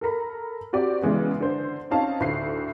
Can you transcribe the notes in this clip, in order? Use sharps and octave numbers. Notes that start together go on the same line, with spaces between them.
A4 A#4 A#5 B5
C4 F#4 G4 D5
C#3 E3 G#3 B3
D3 C5
C4 C#4 D#4 F5 A5
D2 A2 C7